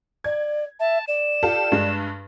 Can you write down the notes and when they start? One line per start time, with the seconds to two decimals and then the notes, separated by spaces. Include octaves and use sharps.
0.24 D5 G#6
0.79 E5 A5
1.07 D5 E7
1.43 F4 G4 A4
1.72 G2 G#3